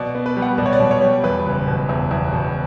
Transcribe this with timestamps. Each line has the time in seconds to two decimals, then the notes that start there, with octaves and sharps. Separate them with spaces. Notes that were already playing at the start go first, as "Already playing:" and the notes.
Already playing: B2 D5
0.15 B3
0.26 B4
0.37 G3
0.42 F#5
0.58 B2 D5
0.66 C#5
0.73 D5
0.80 B2
0.91 C#5
1.02 G3
1.24 E2 B4
1.46 F#1
1.67 B2
1.89 E2
2.11 E2
2.33 B2